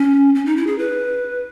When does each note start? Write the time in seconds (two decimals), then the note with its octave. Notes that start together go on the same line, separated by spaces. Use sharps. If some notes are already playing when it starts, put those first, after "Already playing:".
Already playing: C#4
0.35 C#4
0.46 D#4
0.57 E4
0.67 G#4
0.79 B4